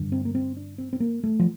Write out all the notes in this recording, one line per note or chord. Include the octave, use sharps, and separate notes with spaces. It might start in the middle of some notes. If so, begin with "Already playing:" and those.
Already playing: G2 D3
C4
A#3
C4
D4
C4
C4
A#3
A3
F3